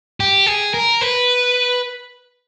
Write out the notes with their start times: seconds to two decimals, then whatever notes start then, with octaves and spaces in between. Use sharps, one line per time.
0.20 G4
0.46 G#4
0.74 A#4
1.01 B4